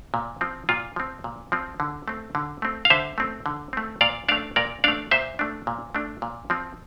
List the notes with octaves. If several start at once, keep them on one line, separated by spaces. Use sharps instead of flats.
A#2
F3 C4
A#2 F4
F3 C4
A#2
F3 C4
D3
A3 C4
D3
A3 C4
F5
D3 C5 E5
A3 C4
D3
A3 C4
A#2 D5 F5
A3 D4 D5 F5
A#2 A#4 D5
A3 D4 D5 F5
A#2 C5 E5
A3 D4
A#2
A3 D4
A#2
F3 C4